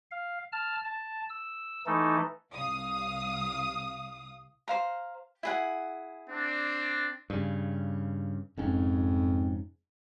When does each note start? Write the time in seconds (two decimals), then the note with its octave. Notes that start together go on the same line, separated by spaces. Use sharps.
0.11 F5
0.52 A5 F6
0.85 A5
1.30 E6
1.86 E3 A3 D#4 A4
2.52 C2 F5 D#6
4.68 C5 F5 A#5
5.43 E4 G#4 F#5
6.29 C4 D4
7.30 G2 C#3
8.57 F1 F2 G#2 C#4